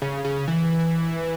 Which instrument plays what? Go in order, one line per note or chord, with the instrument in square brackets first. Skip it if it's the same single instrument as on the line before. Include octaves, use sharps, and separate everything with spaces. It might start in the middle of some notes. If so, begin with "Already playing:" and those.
[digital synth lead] C#3
C#3
E3